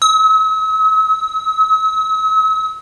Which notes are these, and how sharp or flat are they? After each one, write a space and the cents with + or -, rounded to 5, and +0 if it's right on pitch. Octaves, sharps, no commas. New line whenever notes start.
E6 -45